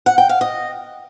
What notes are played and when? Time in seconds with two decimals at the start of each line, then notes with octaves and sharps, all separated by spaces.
0.06 F#5
0.18 G5
0.29 F5
0.41 D#5